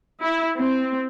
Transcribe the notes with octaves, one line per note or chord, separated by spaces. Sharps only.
E4
C4